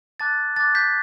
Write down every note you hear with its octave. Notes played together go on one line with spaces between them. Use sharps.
A5 D6 F#6 A6
A5 D6 F#6 A6
G6 B6